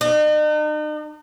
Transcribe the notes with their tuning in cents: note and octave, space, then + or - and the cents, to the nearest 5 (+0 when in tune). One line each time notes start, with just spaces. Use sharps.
D#4 -40